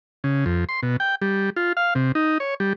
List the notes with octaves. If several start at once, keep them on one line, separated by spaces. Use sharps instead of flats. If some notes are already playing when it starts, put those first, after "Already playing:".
C#3
F2
C6
B2
G5
G3
F4
F5
C3
D#4
C#5
G3